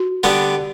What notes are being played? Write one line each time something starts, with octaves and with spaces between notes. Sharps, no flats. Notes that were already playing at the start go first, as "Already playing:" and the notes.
Already playing: F#4
D3 G3 B3 D4